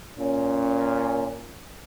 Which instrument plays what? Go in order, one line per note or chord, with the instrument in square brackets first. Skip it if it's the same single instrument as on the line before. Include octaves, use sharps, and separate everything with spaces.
[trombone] A#2 [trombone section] C#4